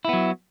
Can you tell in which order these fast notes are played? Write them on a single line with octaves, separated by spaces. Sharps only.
E4 B3 F#3